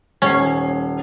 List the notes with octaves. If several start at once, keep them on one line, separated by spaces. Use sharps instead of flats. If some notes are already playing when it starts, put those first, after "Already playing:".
D#1 C#4 G#6 C7